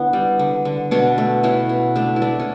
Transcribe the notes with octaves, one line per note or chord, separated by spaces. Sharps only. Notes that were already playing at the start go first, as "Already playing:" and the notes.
Already playing: D3 B3 C#4 E4
G3
D3
D3
B2 D4 F#4
A3
B2 C#4 E4
B2
A3 D4
E4
A3 D4
C#4